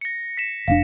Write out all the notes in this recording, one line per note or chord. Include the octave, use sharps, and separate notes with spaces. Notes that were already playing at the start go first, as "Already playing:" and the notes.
A#6 C#7
B6 E7
F1 A#2 D4 F5